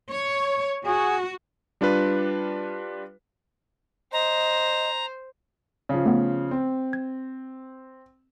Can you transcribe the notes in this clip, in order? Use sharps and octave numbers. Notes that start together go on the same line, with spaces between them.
C#5
F#4 G#4
G3 D4 F4 B4
C5 D#5 A#5
C#3 F3
A3 B3
C4
G#6